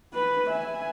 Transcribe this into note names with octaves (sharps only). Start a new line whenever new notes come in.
B4
E5 G#5